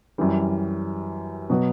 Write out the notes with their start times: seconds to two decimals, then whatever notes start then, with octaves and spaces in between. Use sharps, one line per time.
0.18 F#2 E3 G3
1.50 B2 F#3 B3